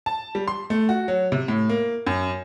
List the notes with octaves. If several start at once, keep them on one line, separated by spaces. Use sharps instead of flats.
A5
G3
C6
A3
F#4
F#3
C3
A2
A#3
F#2